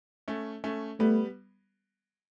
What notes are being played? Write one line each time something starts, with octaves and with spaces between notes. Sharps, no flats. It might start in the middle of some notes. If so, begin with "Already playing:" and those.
A3 C#4
A3 C#4
G3 A3 B3